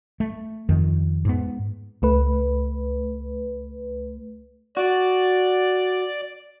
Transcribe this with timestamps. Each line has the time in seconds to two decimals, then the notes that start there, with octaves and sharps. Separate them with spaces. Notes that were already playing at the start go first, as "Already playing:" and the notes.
0.20 A3
0.69 F2 D#3
1.25 G#2 B3
2.02 C#2 A3 B4
4.77 F#4 D5